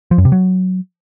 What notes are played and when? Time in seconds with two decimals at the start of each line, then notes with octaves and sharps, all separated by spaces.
0.11 F3
0.18 F#2
0.25 C3
0.32 F#3